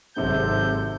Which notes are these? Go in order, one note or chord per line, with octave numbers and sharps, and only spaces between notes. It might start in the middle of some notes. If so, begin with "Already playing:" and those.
G#1 G#2 C3 F#3 A4 C5 G6